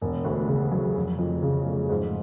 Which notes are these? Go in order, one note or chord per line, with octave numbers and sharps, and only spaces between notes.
E1
D2
C#3
F#3
F1
F2
C#3
F1
G#2